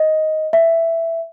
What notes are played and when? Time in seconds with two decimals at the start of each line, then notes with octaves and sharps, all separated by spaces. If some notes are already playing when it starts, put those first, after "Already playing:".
Already playing: D#5
0.53 E5